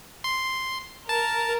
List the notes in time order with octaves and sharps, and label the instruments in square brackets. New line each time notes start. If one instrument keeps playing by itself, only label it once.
[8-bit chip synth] C6
[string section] A#4 [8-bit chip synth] A5